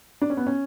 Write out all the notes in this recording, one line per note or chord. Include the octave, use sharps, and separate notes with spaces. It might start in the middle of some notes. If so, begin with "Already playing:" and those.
D4
C#4
B3
C#4